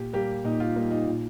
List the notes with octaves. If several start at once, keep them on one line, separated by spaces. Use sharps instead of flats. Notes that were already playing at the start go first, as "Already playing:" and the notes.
Already playing: A#2 G4
G3 A#3 G4
A#2 D#4
F4
G3 A#3 D#4
D#4
A#2